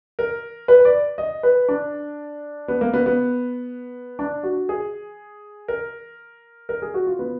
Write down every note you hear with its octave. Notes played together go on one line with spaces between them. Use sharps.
A#4
B4
D5
D#5
B4
D4
B3
A#3
B3
B3
D4
F#4
G#4
A#4
A#4
G#4
F#4
F4
B3